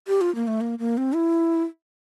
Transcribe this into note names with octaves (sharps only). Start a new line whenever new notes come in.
G4
F4
A#3
A3
A#3
A#3
C4
E4